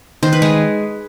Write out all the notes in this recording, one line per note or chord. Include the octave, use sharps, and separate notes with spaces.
D#3 C5
B4
G#3 G#4